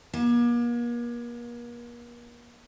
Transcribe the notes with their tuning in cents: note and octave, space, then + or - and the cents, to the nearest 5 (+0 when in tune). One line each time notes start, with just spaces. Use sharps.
A#3 +40